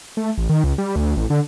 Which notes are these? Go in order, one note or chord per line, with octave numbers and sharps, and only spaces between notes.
A3
A1
D#3
C#2
G3
D2
A1
D3